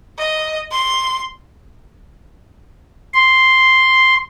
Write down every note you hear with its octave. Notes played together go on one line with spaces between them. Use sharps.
D#5
C6
C6